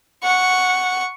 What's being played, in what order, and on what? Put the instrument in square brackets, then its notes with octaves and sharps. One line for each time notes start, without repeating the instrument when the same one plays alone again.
[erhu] F#5 [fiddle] C#6